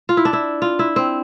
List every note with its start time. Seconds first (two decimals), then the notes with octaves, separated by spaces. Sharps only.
0.09 F4
0.17 E4
0.25 D4
0.33 E4
0.62 F4
0.79 E4
0.96 C4